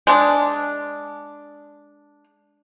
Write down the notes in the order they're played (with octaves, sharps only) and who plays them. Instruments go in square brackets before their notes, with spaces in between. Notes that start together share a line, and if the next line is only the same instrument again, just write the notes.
[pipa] G#3 D4